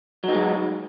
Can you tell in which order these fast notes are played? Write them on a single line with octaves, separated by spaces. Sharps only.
F#3 D#4 G#3